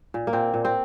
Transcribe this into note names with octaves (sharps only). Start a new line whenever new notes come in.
A#2
A#3
A#2 C4
A#2
C4